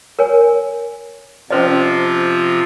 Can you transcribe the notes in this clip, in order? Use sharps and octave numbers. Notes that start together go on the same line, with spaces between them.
A#4 C#5 G#5
C3 F3 C#4 F4 C5 D#5